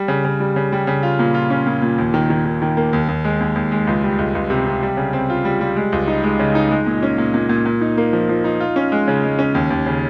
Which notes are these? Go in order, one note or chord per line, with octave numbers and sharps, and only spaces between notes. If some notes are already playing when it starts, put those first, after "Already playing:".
Already playing: G3
C#3
C#3
G3
C#3
G3
C#3
F4
A#2
F4
C#4
A#2
A#2
D#2
D#3
D#3
D#3
D#3
A#3
D#2
D#2
G#3
D#2
D#2
G#3
C#2
G3
C#2
C#2
C3
C3
G3
C#3
C4
F4
G3
G3
G#3
C#2
D#4
G#3
C#3
D#4
G#3
A#2
C#4
A#2
A#2
A#2
A#2
D#4
A#3
F3
F3
D#4
F4
C#4
G#3
C#3
G#3
C#4
D#2
D#2
C#3